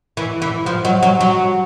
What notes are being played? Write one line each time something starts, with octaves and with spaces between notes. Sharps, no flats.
E3
E3
F3
F#3
F#3
F#3